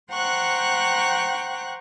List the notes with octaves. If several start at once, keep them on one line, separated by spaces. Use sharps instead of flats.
C5 F#5 G5 A#5 C#6 F#6